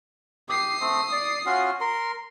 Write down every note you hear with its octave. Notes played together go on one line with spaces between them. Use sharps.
G4 D#6 C7
A3 C4
D5
C#4 F4 F#4
A#4 C6